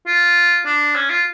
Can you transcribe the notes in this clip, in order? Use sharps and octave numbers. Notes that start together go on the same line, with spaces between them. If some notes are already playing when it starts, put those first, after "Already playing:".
F4
D4
C#4
F4